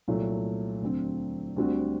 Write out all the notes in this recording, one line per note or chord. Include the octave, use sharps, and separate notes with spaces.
C2 A#2 F#3 A3
D2 D3 F#3 C4
D2 D3 G3 C4 F#4